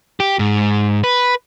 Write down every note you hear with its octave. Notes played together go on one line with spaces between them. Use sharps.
G4
G#2
B4